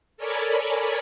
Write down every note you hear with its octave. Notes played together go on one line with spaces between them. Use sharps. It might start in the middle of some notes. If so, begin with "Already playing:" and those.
A4 A#4 C#5 D5 G#5 B5